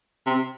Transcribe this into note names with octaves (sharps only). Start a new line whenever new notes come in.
C3